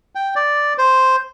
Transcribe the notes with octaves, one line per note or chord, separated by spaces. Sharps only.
G5
D5
C5